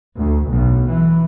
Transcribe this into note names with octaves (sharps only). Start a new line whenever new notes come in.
D2
B1
E3